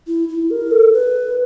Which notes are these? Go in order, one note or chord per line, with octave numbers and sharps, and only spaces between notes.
E4
E4
A#4
A4
B4